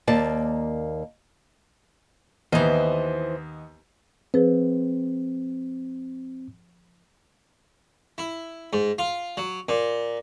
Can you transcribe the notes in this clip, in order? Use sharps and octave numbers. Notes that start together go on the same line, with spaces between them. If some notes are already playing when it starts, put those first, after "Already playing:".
D#2 A#3 D5 A5
D#2 E3 B3 C5 D#5
F3 C4 G#4 B4
E4
G#2
F4
F#3
A#2